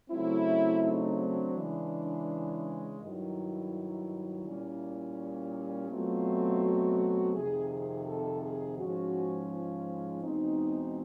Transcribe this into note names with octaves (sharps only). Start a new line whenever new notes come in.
C#3 F#3 A3 C4 E4
D#4
D4
C#3 E3 G#3
G2 D#3 F#3 E4
A#2 G3 A#3 C#4
B2 F#3 A3 C4 F4
F#4
F2 C3 D#3 G#4
G#4
A4
G#4
G#2 F3 G#3 C#4 F#4
F4
E2 B2 G#3 C4 D#4